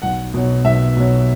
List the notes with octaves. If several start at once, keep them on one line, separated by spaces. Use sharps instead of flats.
B1 F#5
B2 F#3
B1 E5
B2 F#3